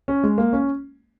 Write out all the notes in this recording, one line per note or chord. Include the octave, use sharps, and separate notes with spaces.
C#4
G#3
A#3
C#4